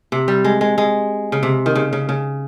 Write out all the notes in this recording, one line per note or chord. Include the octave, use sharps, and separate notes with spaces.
C3
G3
G#3
G#3
G#3
C#3
C3
D#3
C#3
C#3
C#3